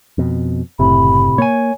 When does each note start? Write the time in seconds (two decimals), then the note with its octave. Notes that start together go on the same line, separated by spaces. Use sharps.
0.18 F2 B2
0.79 F#1 A2 C3 B5
1.38 A#3 C#5 G#5